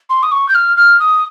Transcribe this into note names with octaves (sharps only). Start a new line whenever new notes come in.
C6
D#6
C#6
G6
F6
F6
D#6